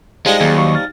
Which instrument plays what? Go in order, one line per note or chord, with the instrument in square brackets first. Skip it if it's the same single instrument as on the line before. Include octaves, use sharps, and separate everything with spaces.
[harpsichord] F3 G3 D#4 [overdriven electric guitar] G#3
[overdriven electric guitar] D#2 [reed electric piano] F#3 G4 G#4
[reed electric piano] F#3 C#6
F6 A6